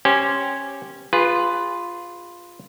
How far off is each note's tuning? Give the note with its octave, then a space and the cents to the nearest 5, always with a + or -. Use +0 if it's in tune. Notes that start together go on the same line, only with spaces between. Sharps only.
C#4 -10 G4 +0 C5 +0
F4 +0 G#4 -30 B4 +5